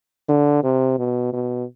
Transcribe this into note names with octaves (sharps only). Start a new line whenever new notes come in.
D3
C3
B2
B2